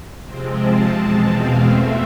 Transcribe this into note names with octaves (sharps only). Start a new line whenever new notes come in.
C3 F3 G#3 C4
A5
E2 B2 G#3 C4 A5
F5
F2 E3 A3 C4 E5